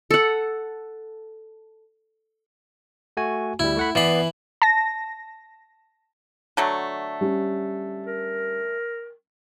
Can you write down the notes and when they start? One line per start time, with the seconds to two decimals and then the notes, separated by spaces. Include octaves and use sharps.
0.11 A4 F#5
3.17 A3 F#4 G#5
3.59 D2 G3 E4
3.77 A3 F#5 B5
3.95 E3 B3 D5 B5 C7
4.62 A5 A#6
6.57 D3 F#3 A3
7.21 G3 C#4
8.06 A#4